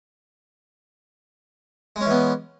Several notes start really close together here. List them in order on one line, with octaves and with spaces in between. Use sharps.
G#3 C#4 E3 B3